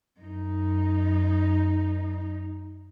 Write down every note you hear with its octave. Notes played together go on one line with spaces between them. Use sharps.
F#2 D#4